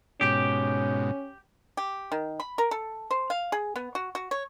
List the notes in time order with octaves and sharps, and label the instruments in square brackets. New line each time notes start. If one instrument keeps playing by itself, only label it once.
[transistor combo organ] G#2 B2 [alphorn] C#4 [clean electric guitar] G4
[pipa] G4
D#3
B5
A#4
A4
C5
F5
G#4
B3
F#4
F#4
C#5